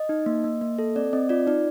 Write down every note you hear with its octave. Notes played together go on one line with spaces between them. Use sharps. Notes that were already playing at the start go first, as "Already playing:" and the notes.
Already playing: D#5
D#4
A#3
A#3
A#3
A4
C4 D5
C4 D#5
F4 D5
D#4 D5